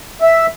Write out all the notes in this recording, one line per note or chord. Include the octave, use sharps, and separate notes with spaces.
E5